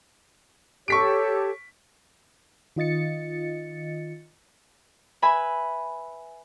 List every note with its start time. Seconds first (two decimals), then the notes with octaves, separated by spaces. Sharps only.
0.88 G4 A4 C#5 C#6 B6 D7
2.76 D#3 F4 D#5 A6 C#7
5.22 B4 E5 G#5 B5